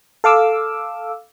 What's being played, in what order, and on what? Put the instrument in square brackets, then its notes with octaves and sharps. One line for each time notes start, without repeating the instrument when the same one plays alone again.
[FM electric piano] A4 F5 D6 E6